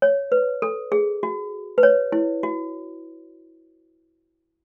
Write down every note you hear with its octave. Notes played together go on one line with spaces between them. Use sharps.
C#5
B4
A4
G#4
F#4
B4
C#5
E4
F#4